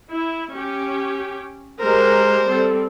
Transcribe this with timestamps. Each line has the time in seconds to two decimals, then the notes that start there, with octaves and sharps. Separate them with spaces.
0.11 E4
0.54 C#4 G4
1.82 G#3 G4 A#4 C5
2.45 G3 C4 A4